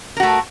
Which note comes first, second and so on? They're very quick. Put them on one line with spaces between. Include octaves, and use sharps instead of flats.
A#4 F#4 A3